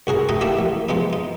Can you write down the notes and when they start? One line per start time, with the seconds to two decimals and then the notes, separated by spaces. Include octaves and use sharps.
0.07 C2 F#4 G#4 A#4
0.29 A3 D#4 D#5 F#5 G5
0.41 A3 A#3 E4 G4 A4
0.59 A1
0.89 F3 G#3 B3 D#4
1.13 D#4